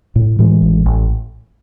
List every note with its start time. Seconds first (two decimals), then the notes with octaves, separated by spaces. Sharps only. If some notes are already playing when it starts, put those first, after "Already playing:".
0.16 A2
0.39 A2 E3 G#3
0.62 A1
0.86 A1